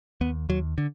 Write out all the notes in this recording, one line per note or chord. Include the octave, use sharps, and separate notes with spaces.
D#2 B3
D#2 F#3
D3